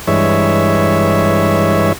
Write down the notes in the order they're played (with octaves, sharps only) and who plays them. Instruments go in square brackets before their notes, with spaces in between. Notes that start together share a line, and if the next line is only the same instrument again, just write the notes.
[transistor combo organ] G2 E3 G#3 C#5 E5